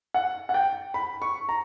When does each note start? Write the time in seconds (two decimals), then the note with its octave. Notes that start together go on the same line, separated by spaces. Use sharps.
0.14 F#5
0.49 F#5
0.54 G5
0.94 B5
1.22 C#6
1.49 A#5